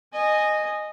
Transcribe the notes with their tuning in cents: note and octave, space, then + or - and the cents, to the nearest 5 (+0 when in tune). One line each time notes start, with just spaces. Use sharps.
D#5 -10 G#5 +0